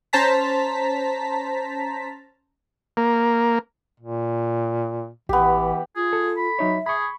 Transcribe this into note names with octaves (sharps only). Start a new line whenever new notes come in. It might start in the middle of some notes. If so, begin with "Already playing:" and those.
C#4 C5 A5 A#5 B6
A#3
A#2
A1 E3 B3 G4
F4 G#4
A4
B5
F#3 D#4 C#5 E5
G#4 B5 C#6